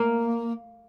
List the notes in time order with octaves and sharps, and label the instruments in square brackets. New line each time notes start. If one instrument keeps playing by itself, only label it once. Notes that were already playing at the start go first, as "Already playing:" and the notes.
Already playing: [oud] A#3